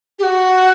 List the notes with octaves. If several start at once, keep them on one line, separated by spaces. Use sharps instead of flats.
G4
F#4